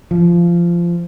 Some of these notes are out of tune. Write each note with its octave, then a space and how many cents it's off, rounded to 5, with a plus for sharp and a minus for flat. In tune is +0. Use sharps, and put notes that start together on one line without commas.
F3 -20